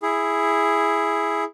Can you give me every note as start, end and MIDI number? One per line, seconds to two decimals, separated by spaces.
0.02 1.44 64
0.02 1.44 68